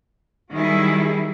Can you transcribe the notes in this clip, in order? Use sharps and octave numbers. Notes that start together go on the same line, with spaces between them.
D#3 F#3 G3 E4 G#4